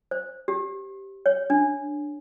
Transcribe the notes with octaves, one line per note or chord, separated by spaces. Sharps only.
C5
G4
C#5
D4